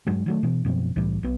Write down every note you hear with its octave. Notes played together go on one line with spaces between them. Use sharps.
G2 F#3 G#3
D#3 F#3 A3
B2 E3
F#2 B2 F3 C4
C2 A2 E3 G3
B1 B3